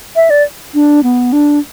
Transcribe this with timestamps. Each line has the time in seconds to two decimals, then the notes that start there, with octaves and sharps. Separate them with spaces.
0.16 E5
0.30 D5
0.74 D4
1.03 B3
1.33 D4